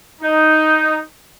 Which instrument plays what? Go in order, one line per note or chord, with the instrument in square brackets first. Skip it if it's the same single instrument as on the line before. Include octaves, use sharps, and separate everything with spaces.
[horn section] D#4